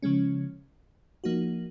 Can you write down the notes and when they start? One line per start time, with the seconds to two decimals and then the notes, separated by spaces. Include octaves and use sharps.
0.03 C#3 F3 G#3 C#4
1.24 F3 A#3 D#4 F#4